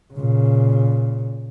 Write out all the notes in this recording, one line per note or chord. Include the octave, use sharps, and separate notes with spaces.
A#2 C#3